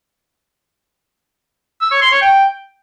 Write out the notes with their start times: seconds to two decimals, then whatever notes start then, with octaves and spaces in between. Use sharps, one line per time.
1.81 E6
1.91 C#5
2.01 C6
2.11 C#5
2.21 G5